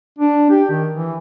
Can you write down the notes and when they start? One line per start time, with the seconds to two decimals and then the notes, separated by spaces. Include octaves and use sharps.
0.19 D4
0.51 G4
0.70 D#3
0.95 E3